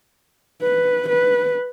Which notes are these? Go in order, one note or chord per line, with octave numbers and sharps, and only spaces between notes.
B4
B4